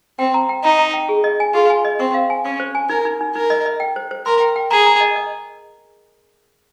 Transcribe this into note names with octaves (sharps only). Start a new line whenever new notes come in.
C4 G5
A#5
G5
D#4 A#5
A#5
G5
G#4
D#5
G#5
F4 G#4
G#5
D#5
C4 C#6
F5
G#5
C#4 C#6
C5
G#5
D#4 A#4
D#4
D#4
D#4 A#4
D#5
D#5
G5
C5
C5
A#4 C6
G5
G5
G#4 A#5
A#5
D#5
D#5